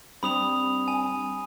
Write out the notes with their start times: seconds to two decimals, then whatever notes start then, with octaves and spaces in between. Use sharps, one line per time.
0.23 G3 C4 D4 B5 D#6 F7
0.88 G#5